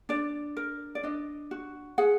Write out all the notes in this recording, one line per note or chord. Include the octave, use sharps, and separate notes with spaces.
D4 D5
A#4
D5
D4 D#5
F#4
G#4 F#5